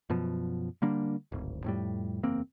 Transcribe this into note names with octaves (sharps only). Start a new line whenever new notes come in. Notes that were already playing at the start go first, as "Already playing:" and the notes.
F#2 B2 F3
D3 G3 A#3 D4
D1 G#1
F2 A2 G3
F#1 E2 A#3 C4